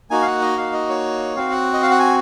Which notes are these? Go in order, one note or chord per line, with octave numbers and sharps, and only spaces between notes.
A#3 D#4 F#4 G#5
F5
F#5
D#5
F5
D#5
C#5
C4 F#4 F5
F#5
D#5
F5
F#5
G#5